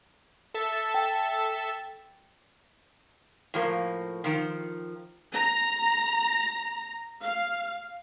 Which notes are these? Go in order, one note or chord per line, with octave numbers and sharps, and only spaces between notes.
A4 E5 A5
G5
A2 F3 A#3
D#3 F3
A#5
F5